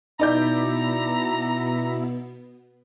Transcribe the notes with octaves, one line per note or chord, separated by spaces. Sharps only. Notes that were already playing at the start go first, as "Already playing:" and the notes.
B2 B3 D#4 E4 D5 A#5 G6